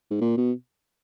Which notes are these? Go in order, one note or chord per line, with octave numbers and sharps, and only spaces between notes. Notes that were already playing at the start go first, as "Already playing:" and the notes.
G#2
A#2
B2